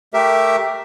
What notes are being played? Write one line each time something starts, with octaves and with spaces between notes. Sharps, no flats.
A3 G4 A#4 E5